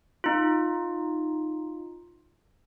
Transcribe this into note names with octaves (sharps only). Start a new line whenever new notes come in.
D#4 F4